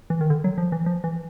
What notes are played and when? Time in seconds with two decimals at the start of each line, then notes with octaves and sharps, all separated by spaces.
0.10 E3
0.21 D#3
0.30 D3
0.44 F#3
0.58 F3
0.72 E3
0.86 F3
1.04 E3